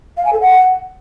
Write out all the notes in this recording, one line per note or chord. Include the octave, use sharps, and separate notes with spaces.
F5
G#5
A4
F#5